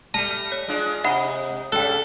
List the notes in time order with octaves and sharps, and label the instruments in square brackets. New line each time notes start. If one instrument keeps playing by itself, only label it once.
[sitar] G3 A3 [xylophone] A5 D#7 [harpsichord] A#5
[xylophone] C#5
[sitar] G#3 D4 F4
[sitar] C3 D#4 D#5 [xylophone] E5 F#5 B5
[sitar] C#3 G3 [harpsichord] A4 [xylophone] G5 F#6